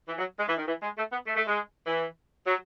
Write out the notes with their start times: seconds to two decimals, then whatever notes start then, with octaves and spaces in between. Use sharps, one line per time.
0.08 E3
0.18 F#3
0.38 G#3
0.47 E3
0.58 D#3
0.67 E3
0.82 G#3
0.97 A3
1.12 B3
1.27 A3
1.37 A3
1.47 G#3
1.86 E3
2.46 F#3